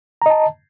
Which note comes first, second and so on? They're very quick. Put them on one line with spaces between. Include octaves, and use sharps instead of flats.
A#5 D#5 A5